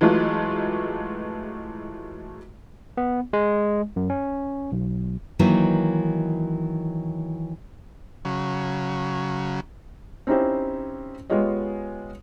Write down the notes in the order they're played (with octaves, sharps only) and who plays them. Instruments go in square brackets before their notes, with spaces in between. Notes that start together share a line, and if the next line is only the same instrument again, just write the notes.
[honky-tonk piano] E3 F#3 G#3 A3 F4
[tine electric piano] B3
G#3
F#2
C#4
B1
[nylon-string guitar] D#3 E3 F#3 A#3 D#4 E4
[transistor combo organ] C#3 F#3
[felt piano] C4 C#4 D#4 E4 G4 C5
G#3 B3 F4 G4 C#5 D#5